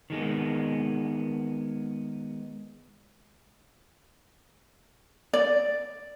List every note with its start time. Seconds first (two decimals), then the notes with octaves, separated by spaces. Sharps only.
0.10 D#3 G#3 B3
5.33 D5